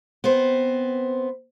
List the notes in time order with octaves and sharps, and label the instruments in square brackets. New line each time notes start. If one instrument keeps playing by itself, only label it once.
[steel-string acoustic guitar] B3 C4 C5